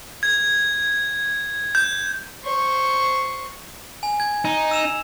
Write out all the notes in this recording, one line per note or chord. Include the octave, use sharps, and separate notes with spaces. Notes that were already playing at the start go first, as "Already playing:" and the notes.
G#6
G6
C5 C#6
G#5
G#6
D#4
E6 E7 F7